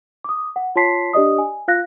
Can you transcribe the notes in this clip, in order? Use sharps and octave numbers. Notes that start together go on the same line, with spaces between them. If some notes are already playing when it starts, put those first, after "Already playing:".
D6 D#6
F#5
F4 C#5 A5 C6 B6 C7
D4 G4 D5 D#5 D#6
G#5
F4 F5 F#6 A#6